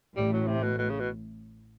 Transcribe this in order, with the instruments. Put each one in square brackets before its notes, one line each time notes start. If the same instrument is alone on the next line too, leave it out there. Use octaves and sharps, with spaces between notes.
[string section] A1 A2 [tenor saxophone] G3
[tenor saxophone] F#3
C3
B2
B2
C#3
B2